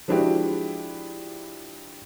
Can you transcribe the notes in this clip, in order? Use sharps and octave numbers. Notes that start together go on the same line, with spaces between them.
F3 G#3 D4 E4 F#4 G4